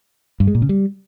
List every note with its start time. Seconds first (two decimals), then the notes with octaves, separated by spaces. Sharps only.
0.40 G2
0.47 G#3
0.55 A#2
0.62 C#3
0.69 G3